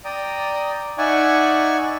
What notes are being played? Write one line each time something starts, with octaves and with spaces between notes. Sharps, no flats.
D5 G5 A#5 D#6
D#4 D5 E5 F#5 G#5 C#6